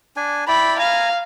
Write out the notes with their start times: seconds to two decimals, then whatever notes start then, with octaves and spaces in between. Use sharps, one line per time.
0.16 D4 G#5
0.48 E4 D5 G5 B5
0.79 F5 G#5 A#5